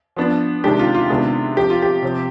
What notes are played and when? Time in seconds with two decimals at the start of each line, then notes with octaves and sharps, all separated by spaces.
0.17 F3 B3 D4
0.64 C3 D#3 G#3 D4 G4
0.79 F4
0.94 F4
1.10 C3 D#3 G#3 B3 D4
1.56 F3 C4 G4
1.70 F4
1.82 G4
2.02 C3 F3 C4